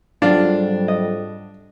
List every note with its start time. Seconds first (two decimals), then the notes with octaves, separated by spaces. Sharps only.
0.22 F2 G#2 F#3 G3 D4 F4
0.88 D#5